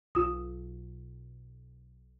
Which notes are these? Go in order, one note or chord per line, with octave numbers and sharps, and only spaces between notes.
B1 F4 D#6